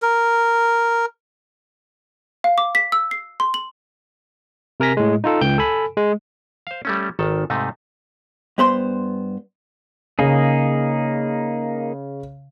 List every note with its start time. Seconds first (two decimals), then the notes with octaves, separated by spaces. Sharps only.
0.02 A#4
2.44 F5
2.58 D6
2.75 B6
2.92 E6
3.11 C7
3.40 C6
3.54 F#7
4.80 C3 A#4 G#5 A#6 B6
4.97 A2 G#3
5.24 D#4 F4 A4
5.41 C#2 G5 G6
5.58 A4 G#5 B5
5.97 G#3
6.67 C5 F5
6.85 G3 A3 C#4
7.19 G#1 D#3 A4
7.50 G#2 C3 A3 D#4
8.58 G2 B3 C5 C6
10.19 C#3 A#3 D#4 G#4